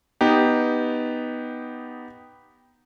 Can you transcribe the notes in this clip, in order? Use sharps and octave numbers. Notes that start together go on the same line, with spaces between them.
B3 D#4 G4